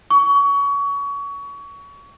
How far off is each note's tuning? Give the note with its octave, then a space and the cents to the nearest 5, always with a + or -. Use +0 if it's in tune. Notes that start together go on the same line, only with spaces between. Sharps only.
C#6 +25